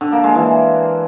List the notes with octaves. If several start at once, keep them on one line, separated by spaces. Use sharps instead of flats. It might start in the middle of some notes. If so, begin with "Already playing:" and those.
D3
A#3
G#3
E3